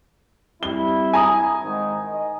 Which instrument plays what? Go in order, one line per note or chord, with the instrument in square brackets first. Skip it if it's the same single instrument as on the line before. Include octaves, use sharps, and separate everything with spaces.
[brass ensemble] G3 C4 E4 [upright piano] G7
[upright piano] G#5 A#5 D#6
[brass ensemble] G#2 D#3
D#5